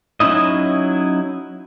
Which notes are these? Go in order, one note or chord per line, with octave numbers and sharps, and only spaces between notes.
F#3 C#4 D#4 E4 D#5